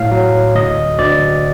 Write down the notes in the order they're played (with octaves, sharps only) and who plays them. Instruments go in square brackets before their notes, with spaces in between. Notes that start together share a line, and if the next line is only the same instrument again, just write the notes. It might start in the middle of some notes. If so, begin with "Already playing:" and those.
Already playing: [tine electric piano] A2 F5
F#3
D2 D#5
D2 D5